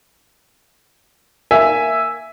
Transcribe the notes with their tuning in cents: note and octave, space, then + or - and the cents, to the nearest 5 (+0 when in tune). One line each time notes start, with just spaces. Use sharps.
A#3 +0 E5 +0 G#5 +0